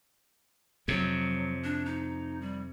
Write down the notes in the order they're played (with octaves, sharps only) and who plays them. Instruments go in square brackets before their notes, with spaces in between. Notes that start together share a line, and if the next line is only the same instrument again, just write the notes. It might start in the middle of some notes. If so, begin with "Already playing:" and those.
[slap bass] F2 C3 [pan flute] F#3
[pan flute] D4
D#4
G3